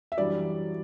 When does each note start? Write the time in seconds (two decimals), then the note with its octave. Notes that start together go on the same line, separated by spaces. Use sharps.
0.12 E5
0.17 F#2 E3 G3 D4 D5